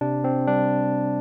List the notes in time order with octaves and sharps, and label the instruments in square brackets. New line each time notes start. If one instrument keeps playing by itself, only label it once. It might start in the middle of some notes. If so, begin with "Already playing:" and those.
[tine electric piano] C3 D4
C4
G3 D4